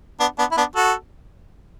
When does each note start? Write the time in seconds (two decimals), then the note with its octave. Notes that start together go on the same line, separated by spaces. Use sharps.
0.20 B3 D4
0.39 B3 D4
0.51 E4
0.57 B3 D4
0.76 F#4 A4